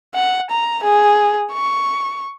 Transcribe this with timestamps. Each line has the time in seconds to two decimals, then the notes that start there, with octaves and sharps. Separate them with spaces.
0.15 F#5
0.51 A#5
0.84 G#4
1.52 C#6